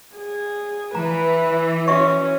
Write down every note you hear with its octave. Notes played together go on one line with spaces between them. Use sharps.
G#4
E3 B4 A#5
C#4 F#4 E5 C#6